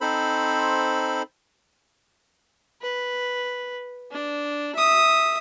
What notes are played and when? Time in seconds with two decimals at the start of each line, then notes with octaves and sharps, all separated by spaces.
0.01 C4 D#4 A4 C5 B5
2.82 B4
4.11 D4
4.75 E5 D#6